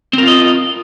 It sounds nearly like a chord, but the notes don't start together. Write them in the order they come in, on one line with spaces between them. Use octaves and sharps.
C4 A#4 F4 D#5